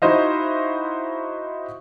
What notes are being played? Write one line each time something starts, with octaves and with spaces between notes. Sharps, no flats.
D#4 E4 F#4 C5 D#5 F5